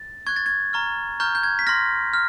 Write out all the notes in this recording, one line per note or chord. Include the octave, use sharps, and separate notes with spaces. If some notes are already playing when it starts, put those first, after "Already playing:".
Already playing: A6
C#6 F#6 G#6
A6
G#6
A#5 C#6 F6
A#5 C#6 F6 G6
G6
G#6
B6
C6 F6 A#6
F6